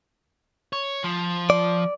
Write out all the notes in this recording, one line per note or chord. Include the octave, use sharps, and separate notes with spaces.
C#5
F3
D5